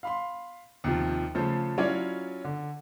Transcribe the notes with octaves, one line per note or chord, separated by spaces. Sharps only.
F5 B5 C6
D#2 C3 F3
C#3 F3 A3 A4 C5
F#3 C#4 E4 F4 C#5 D5
D3